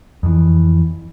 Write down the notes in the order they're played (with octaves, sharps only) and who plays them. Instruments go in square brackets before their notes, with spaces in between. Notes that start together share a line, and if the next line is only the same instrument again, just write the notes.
[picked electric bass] F2 E3